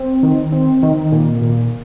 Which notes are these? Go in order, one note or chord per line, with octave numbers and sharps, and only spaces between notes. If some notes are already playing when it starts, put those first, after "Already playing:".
Already playing: C4
D#3
C4
D#3
A#2
A#2